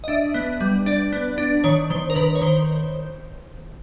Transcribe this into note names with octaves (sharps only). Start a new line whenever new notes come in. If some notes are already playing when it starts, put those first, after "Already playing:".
D#5
D4 E5
B3
G3
D4 D5
B3
D4
D#3 C#5
D#3 C5
A#4
D#3 B4
C#5
D#3 C5